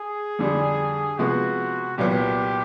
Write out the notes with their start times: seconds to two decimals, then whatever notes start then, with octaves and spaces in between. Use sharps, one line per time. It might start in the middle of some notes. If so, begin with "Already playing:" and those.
Already playing: G#4
0.39 F2 D3 G3
1.18 C3 F3 G#3 B3 F#4
1.98 C2 A#2 F#3 B3 G4